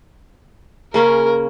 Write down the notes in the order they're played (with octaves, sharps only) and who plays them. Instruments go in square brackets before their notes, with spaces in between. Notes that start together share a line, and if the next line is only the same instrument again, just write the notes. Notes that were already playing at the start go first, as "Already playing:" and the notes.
[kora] C#3 A#3 C#4 [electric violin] A#4